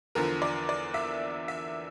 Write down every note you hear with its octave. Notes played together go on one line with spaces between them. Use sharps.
E2 D3 F3 A#4
D5
D5
E5
E5